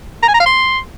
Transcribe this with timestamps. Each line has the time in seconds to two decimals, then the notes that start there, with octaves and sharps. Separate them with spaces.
0.22 A#5
0.28 G#5
0.34 A#5
0.40 F5
0.46 C6